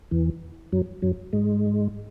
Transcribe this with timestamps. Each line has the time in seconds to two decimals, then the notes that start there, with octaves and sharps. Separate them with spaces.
0.11 E2 E3
0.72 F#2 F#3
1.02 F#2 F#3
1.33 G#2 G#3